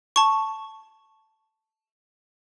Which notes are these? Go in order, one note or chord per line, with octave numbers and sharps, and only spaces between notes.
A5 C#6